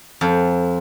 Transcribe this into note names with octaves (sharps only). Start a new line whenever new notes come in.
F2